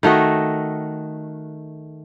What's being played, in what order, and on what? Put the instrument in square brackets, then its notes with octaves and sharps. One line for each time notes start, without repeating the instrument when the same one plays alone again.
[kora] D#3 A3 F#4 D#5